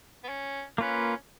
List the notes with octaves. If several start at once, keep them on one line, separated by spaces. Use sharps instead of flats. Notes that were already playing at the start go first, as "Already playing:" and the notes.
B3
C#4
A#3 C#4 F4 B4